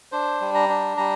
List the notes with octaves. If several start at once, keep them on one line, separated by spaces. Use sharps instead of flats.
D4 C5
G3
A#5
D4
G3 A#5